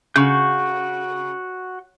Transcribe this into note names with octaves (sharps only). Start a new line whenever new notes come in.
C#3 F#4 C#6 G6